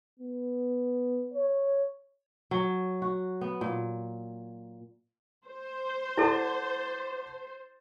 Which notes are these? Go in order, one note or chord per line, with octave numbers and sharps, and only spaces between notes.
B3
C#5
F#3
F#4
B3
A#2
C5
E4 A4 D5 F#5 A5